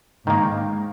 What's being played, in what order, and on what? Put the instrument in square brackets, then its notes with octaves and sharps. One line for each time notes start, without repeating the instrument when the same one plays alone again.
[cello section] G#2 [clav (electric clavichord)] D#3 A#3